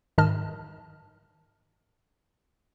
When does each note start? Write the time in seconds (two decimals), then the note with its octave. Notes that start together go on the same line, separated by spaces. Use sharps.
0.18 G#2 D#3 D#5 A5 F6